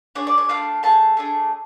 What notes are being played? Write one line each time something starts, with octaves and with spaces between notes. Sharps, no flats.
D4 G#4 C#5
D5
C#5
A3 D4 F4 F5
A3 F4 G#4 A5
A3 D4 G#4